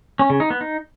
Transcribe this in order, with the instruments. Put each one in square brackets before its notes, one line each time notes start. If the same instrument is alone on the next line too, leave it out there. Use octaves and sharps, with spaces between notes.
[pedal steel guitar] C#4
C#3
D#4
B3
D#4